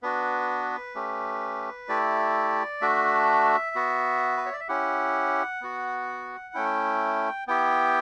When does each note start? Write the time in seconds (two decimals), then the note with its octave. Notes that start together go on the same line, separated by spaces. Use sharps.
0.03 B3 D4 F#4 B4
0.95 A3 C#4 G4
1.88 A3 E4 G4 D5
2.81 A3 D4 F#4 E5
3.76 B3 F#4
4.37 B4
4.46 C#5
4.53 D5
4.60 E5
4.68 C#4 E4 G4 F#5
5.61 B3 F#4
6.54 A3 C#4 E4 G5
7.47 B3 E4 G4 G5